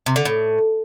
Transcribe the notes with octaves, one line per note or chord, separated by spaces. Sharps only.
C3
D3
A2